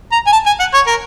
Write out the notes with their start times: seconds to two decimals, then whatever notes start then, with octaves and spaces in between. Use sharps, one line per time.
0.12 A#5
0.27 G#5
0.33 A5
0.46 G#5
0.60 F#5
0.74 C#5
0.87 A#4